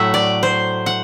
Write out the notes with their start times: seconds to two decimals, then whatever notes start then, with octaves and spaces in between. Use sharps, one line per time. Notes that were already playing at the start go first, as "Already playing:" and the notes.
Already playing: A2 F#3 A3 E5 F#5
0.14 D5
0.43 C5
0.86 F#5